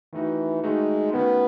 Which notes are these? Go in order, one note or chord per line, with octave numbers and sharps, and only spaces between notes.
D#3 E3 A3 D#4 F#4
D#3 G#3 A3 D#4 F#4
D#3 A3 B3 C#4 F#4